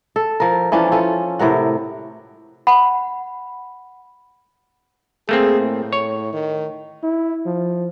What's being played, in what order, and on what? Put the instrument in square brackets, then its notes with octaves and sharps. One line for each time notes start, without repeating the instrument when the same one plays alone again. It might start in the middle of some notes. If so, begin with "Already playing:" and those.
[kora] A4
F3 A#4
E3 F3 C#4 D4
C#4 F4 A4
A2 C3 A#4 F#5
[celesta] F#5 B5
[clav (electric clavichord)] A3 A#3 C4 [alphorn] G#4
[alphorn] A2
[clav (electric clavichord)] C#5
[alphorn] D#3
[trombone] E4
F3